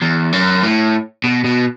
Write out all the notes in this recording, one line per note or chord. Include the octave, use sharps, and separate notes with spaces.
E2
F#2
A2
B2
B2